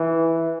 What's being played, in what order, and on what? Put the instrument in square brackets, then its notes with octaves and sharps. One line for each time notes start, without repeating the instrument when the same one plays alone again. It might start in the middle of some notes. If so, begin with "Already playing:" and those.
Already playing: [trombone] E3